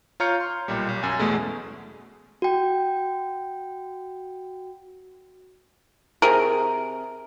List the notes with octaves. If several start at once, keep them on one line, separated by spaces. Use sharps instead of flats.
F4 C#5 A#5 F6 G6 C#7
C6
B1 A#2 G3
B1
F#2 G#5
E2 B2 G#3 A3
F#4 G5
C3 G#4 A#4